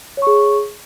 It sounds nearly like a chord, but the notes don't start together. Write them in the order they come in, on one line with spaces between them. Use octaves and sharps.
C#5 C#6 G#4